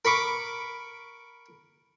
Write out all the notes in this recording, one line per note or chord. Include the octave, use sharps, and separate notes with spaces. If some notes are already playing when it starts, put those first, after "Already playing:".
A#4 B5 C#6 D6